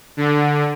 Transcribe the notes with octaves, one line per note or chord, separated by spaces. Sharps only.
D3